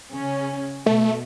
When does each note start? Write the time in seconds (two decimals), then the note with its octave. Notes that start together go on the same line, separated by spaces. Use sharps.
0.11 C#3 C#4
0.86 B2 A3